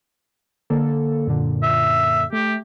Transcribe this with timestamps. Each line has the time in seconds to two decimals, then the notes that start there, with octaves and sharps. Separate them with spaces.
0.70 D3 A#3 A4
1.27 F#2 A#2 D3
1.63 E5
2.33 A3 G4